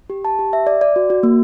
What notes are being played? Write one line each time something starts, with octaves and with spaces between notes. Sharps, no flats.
G4
A5
G4
E5
D5
D5
F#4
F#4
A#3